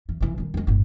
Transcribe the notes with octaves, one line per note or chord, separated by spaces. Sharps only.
E3
C3 E3
D#3 G3
C#2 G#3
G1 A2